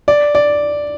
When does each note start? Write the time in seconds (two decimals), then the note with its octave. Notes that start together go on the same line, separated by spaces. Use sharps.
0.08 D5
0.35 D5